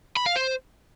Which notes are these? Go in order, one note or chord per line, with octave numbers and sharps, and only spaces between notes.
B5
F5
C5